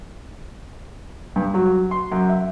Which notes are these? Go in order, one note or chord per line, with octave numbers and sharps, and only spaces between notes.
G2
F#3
C6
F#2
E5